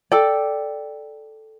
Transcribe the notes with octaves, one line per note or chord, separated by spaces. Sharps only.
A4 D5 G5